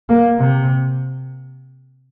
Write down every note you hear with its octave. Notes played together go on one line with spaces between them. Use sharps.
A#3
C3